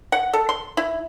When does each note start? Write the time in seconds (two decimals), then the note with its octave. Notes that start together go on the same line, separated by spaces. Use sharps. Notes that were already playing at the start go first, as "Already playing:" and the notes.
0.12 F#5
0.33 A4
0.49 C6
0.77 E4